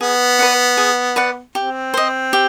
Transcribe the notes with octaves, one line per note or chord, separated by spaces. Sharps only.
B3 G#4
B4 D5 F#5
G#4
B4 D5 F#5
C4 G4
C5 D#5
G4